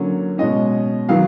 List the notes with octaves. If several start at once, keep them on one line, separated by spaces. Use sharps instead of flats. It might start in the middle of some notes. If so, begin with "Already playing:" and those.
Already playing: D3 F#3 A#3 C#4
B2 G#3 C#4 D#5
D#3 F#3 B3 F5